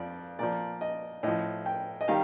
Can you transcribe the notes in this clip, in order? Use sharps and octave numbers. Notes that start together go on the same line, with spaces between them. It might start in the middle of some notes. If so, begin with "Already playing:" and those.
Already playing: F2 F3 D5
A#2 F3 D5
D#5
A2 F3 D#5
G5
D#5
D#3 G3 F5